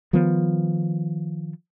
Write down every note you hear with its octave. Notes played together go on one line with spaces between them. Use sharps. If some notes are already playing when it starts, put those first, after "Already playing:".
D#3 F3 G3 B3